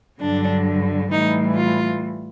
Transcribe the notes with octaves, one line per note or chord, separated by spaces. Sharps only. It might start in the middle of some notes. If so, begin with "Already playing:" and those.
G2 D3 F#3 D4
A2 E3 G3 D#4
F4